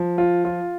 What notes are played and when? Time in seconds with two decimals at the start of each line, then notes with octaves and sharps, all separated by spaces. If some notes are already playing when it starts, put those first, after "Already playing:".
Already playing: F3
0.18 F4
0.45 F4